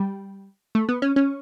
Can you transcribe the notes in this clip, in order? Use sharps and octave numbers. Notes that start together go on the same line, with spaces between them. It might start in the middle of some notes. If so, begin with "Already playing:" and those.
Already playing: G3
A3
B3
C#4
C#4